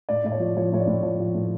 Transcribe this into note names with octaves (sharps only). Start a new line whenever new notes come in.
A2 D5
A2 D5
C#5
F3
F3 C#5
A2 C#5
D5
A2
F3 C#5
F3
A2